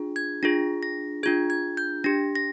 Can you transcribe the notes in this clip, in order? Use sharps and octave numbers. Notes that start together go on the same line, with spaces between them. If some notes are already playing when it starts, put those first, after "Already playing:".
Already playing: D4 F4 G#4
G#6
D4 F4 G#4 A#6
A#6
D4 F4 G#4 G#6
G#6
G6
D4 G4 A#6
A#6